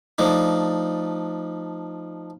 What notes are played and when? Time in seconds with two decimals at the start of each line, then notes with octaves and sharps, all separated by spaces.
0.18 F3 A3 D4 D#4